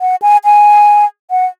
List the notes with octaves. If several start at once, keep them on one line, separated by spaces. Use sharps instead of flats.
F#5
G#5
G#5
F#5